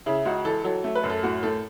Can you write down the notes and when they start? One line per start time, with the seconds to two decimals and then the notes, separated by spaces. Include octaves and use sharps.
0.06 C#3 E4
0.25 C#2 F#4
0.45 E3 A4
0.64 F#3 A4
0.84 A3
0.95 B4
1.04 F#2
1.10 A4
1.23 A2 F#4
1.43 A2 A4